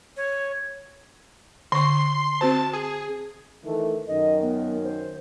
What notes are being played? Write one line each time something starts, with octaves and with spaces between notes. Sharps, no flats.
C#5
D3 C6 C#6
C4 F#4 C5 A5
G#4
D#3 E3 A3
F#2 D#3 D#5
B3
C5